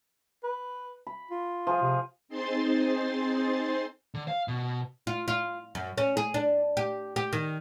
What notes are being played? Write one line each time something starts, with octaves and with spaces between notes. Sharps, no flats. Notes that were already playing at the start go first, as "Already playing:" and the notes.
B4
B5
F4
F3 G#4
C3
C4 D#4 G#4 C5 C6 A6
D3
F5
B2
F4
F4
F#2
C#4
G#4
D4
G4
G4
D#3